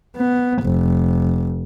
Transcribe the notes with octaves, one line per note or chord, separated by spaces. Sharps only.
B3
F1